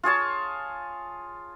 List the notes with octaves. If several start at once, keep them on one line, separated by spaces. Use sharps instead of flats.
F4 G#4 C#5 A5